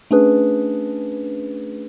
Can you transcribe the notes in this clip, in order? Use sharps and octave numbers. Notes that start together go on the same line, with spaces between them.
A3 C#4 D4 G#4 B4